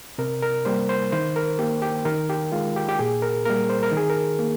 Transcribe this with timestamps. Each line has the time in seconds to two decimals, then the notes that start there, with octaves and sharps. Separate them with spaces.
0.18 C3 A#4
0.43 A#4
0.65 G3 A#3 C5
0.89 C5
1.12 D#3 C5
1.36 A#4
1.59 A#3 G4
1.82 G4
2.05 D#3 A#4
2.30 G4
2.52 G#3 F4
2.76 G4
2.89 G4
2.99 A#2 G#4
3.22 A#4
3.46 G3 A#3 A#4
3.70 C5
3.83 A#4
3.92 D#3 G#4
4.10 A#4
4.39 A#3